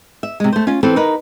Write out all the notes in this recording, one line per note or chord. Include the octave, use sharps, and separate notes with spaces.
E5
C3 G#3
A3 C5
C#4 F4
E3 C4 A4 B4
D#4 A#4 B4